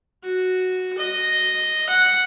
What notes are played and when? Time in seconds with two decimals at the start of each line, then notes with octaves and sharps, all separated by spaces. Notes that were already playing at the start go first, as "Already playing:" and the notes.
0.24 F#4
0.98 D#5
1.90 F#5